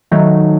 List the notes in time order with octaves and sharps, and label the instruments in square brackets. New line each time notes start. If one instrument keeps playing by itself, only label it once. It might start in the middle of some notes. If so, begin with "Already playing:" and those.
[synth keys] D#3 F#3 A3 D#4